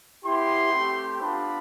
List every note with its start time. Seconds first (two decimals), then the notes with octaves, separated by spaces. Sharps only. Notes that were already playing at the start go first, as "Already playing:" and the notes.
0.24 B3 E4 G4 C6
0.73 A3 C4 G4
1.21 B3 D4 F4 B5